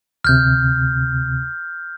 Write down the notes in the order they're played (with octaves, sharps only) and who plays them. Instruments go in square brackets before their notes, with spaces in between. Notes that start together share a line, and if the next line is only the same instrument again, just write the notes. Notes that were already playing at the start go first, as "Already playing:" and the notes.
[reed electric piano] D2 C3 [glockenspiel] F6 G6